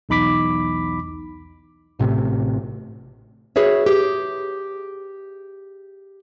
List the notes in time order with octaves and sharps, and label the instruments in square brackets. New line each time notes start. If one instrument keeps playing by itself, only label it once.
[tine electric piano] B1 E2 D#4 B5 D6 B6
[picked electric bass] A1 A2 C3
[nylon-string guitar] F#4 G#4 B4 C#5 E5
G4 G#4